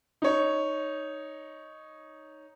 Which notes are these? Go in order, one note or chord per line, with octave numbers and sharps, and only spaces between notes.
D#4 C#5